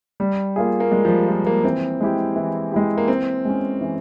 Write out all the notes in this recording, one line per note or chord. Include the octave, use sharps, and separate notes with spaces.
G3
A#3 F4 G#4
A#3
G3 G#3
F3
G3
A#3 F4 G#4
A#3
E3 C4
G#3 E4 G4
E3
G#3 E4 G4
A#3
E3 C4
G#3 C#4
E3